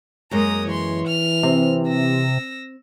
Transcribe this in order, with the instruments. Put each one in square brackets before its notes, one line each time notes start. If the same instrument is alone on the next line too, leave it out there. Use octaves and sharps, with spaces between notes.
[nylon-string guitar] F#2 G#3 A#3 [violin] A#5 D#6
[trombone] E3 [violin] C#5 C6
[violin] F6
[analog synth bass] C3 [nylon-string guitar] C4
[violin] E6 A#6